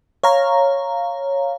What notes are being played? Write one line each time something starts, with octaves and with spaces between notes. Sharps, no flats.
C#5 F5 A#5